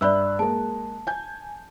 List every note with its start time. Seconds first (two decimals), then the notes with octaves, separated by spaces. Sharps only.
0.01 G2 D5 E5 B5 E6 F#6
0.39 G#3 A#3 A5
1.07 G#5 G6